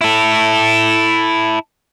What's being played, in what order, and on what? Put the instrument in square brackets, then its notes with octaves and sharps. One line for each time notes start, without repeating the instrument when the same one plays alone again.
[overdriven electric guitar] E4 A4